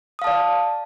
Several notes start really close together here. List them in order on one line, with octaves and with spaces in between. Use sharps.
D#6 F5 A5 D5